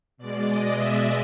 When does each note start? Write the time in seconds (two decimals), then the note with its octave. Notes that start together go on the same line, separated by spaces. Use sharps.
0.18 B2 G#3 D5
0.46 D#5
0.74 E5